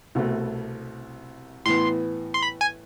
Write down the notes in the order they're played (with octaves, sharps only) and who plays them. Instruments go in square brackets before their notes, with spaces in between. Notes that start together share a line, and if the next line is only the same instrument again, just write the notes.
[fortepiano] C2 B2 A3
[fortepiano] A2 E3 B3 [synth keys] C6
[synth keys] C6
B5
G#5